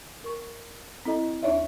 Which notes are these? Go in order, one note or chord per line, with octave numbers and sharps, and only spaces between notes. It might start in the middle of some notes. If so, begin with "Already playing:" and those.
A#4 C#6
C4 E4 A4 D#5
D#2 D4 D#4 C#5 D5 E5